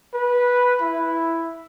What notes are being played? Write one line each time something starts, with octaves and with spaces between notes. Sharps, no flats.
B4
E4